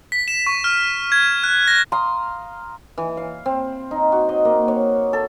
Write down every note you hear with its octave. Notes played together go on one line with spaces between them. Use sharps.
B6
E7
C#6
F6
G#6
F#6
A#6
F5 A#5 C6 D#6
E3
F5
C4
D#4
F#4
D#5
A#3
C#5
A4